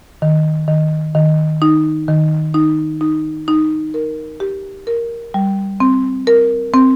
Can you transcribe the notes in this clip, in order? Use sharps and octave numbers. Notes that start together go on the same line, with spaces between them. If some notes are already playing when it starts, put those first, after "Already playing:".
D#3
D#3
D#3
D#4
D#3
D#4
D#4
D#4
A#4
G4
A#4
G3
C4
A#4
C4